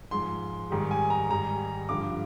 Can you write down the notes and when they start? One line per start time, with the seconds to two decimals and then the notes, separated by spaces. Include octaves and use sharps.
0.11 G#2 F3 C6
0.71 G#2 D#3 G3
0.91 G#5
1.10 A#5
1.29 G#2 D#3 G3 A#5
1.89 G2 D3 F3 D6